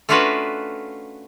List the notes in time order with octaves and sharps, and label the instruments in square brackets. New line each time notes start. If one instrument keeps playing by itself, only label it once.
[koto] A3 C#4 D4 F4 F#4 B4